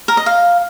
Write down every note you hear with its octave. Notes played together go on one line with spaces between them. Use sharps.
A#4
D#5
F5